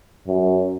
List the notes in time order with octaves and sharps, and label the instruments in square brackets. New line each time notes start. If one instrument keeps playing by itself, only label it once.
[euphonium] F#2